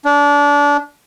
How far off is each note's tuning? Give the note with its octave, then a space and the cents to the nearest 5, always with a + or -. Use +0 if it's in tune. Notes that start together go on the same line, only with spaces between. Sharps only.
D4 -25